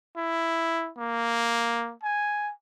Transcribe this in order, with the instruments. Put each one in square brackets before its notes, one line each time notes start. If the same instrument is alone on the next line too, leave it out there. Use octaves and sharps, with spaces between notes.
[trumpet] E4
A#3
G#5